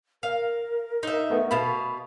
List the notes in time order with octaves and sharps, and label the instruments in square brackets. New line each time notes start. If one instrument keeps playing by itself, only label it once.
[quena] A#4 [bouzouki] F5
[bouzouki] D#4 E5
[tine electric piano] A3 B3
[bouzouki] B2 F5 [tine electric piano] B5